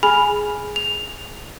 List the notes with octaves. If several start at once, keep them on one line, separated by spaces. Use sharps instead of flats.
G#4 G#5 B5 F6 F7
F7